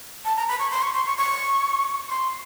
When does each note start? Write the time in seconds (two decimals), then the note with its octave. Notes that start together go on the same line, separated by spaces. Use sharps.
0.25 A5
0.36 A#5
0.48 B5
0.59 C#6
0.71 C6
0.82 C#6
0.94 C6
1.06 C#6
1.18 C#6
2.10 C6